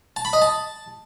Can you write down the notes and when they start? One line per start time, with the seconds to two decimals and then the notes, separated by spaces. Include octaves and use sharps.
0.16 A5
0.25 B5
0.33 D#5
0.42 A5